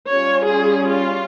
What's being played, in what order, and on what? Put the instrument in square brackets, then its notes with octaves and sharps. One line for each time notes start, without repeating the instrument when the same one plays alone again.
[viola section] G3 C#4 F4 C#5
G#4
F4